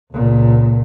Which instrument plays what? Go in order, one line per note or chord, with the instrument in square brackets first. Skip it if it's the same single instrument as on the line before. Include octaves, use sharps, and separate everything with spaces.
[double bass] C#2 A#2